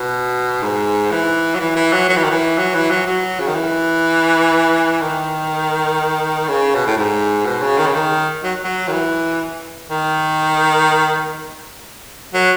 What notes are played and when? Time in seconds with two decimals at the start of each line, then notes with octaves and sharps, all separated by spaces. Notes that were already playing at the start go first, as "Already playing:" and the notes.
Already playing: B2
0.63 G#2
1.11 E3
1.55 F#3
1.60 E3
1.76 E3
1.93 F#3
2.09 F#3
2.16 E3
2.24 D#3
2.31 E3
2.58 F#3
2.74 E3
2.91 F#3
3.06 F#3
3.40 C#3
3.48 D#3
3.55 E3
5.01 D#3
6.48 C#3
6.75 B2
6.86 A2
6.97 G#2
7.45 B2
7.62 C#3
7.78 D#3
7.87 C#3
7.95 D#3
8.44 F#3
8.64 F#3
8.88 D#3
8.92 E3
9.90 D#3
12.34 F#3